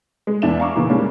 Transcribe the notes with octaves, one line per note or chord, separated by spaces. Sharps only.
G#3
E2 E3 D4 E5 E7
E5 F5 A#5 C#6 D6
A#2 C#3 E3
E3 G3 G#3 A#3 C#4 D4